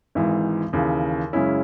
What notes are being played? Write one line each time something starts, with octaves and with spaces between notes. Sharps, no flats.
G#1 G#2 E3
D#2 C#3 E3
F#2 C#3 G#3 C#4 E4